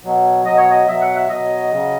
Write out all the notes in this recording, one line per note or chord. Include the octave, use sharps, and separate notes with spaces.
B2 F#3
B2 F#3 D#5
C#5
D#5
B2 F#3 E5
F#5
E5
B2 F#3 D#5
C#3 F#3